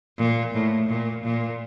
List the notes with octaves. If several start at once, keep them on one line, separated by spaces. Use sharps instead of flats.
A#2
A2
A#2
A#2